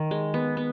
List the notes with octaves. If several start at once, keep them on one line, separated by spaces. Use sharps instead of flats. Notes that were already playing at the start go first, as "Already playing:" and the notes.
Already playing: D#3
G#3
B3
B3